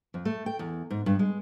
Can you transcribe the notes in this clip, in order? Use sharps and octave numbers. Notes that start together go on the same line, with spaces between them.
F2
A3
G5
E2
G#2
G2
G#3